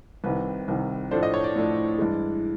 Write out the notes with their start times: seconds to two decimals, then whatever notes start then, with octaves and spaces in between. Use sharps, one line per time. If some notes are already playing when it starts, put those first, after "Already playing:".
0.24 C2 C3 D#3 B4
0.68 C2 C3 D#3
1.11 A2 F3 A3 D4 C5
1.23 D#5
1.34 C#5
1.44 D5
1.55 A2 F3 A3 D4
1.99 G2 E3 G#3